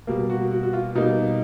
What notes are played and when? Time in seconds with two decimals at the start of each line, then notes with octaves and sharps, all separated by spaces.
0.07 B2 G3 A#3
0.30 F#4
0.51 F#4
0.63 F#4
0.73 F4
0.95 B2 G3 A#3 D#4